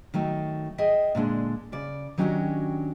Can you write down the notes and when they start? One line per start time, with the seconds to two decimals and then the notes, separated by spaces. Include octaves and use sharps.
0.14 D#3 F#3 A3
0.78 G#4 D#5 E5 G5
1.15 A#2 D3 G#3 D4
1.72 C#3 D5
2.18 D#3 F#3 C#4 D4 F#4 G4